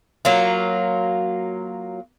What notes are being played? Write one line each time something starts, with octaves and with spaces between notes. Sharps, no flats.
F#3 A#3 F4